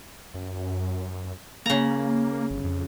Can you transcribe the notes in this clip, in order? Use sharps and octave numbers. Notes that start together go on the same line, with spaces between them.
F#2
C#3 A#3 A#5
G1
F2